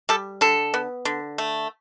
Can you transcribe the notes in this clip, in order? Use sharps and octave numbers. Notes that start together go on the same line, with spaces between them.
G3 A4
D3 A4
B3
D3
A3